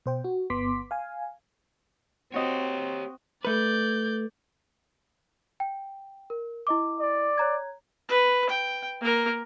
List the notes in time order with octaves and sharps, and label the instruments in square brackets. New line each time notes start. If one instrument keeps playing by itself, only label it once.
[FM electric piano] B2 C5 G5
F#4
G1 B3 C6 D6 B6
F5 G#5
[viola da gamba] C4 [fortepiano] F#4 D#5 [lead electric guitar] G4 C#5
[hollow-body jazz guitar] A3 B4 [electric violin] D5 G6
[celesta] G5
A#4
E4 D#5 D6
[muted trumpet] D5
[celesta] C#5 A#5 G#6
[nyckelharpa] B4
G5
A#3 A#4